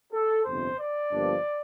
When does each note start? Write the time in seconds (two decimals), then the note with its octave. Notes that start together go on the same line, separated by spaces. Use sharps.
0.12 A4
0.44 G1 F2 C3 C5
0.78 D5
1.11 G1 G2 F3 A#3 D4